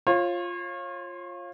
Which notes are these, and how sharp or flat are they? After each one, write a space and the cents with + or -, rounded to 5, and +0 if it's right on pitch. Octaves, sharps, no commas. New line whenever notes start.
F4 +0 C#5 -35